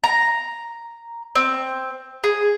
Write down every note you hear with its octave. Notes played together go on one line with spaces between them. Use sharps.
A#5
C4
G#4